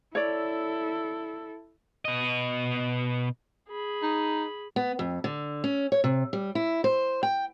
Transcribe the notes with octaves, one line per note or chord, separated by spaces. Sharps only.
E4 A4 C#5 D5
B2 D#5
G#4 B5
D#4
B3
F2
D3
C#4
C#5
C3
G3
E4
C5
G5